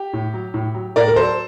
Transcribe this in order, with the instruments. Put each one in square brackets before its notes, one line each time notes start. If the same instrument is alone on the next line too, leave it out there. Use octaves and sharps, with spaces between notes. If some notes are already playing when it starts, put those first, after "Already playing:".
Already playing: [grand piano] G4
A2
F#3
A2
F#3
A2 A#4 D5
A#4
F#3 A4 C5